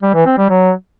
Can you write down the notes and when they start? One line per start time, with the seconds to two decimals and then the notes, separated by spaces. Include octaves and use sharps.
0.02 G3
0.14 E3
0.26 C4
0.38 G3
0.49 F#3